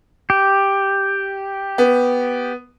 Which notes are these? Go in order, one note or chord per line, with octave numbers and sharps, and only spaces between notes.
G4
B3